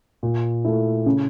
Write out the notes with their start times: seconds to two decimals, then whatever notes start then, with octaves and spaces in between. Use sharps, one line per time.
0.23 A#2
0.65 A3 E4
1.06 C#3